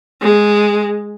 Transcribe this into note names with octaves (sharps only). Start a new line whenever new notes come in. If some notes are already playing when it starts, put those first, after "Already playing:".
G#3